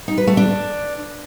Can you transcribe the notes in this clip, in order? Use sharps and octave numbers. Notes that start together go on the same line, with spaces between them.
D#4
B4
A3
D4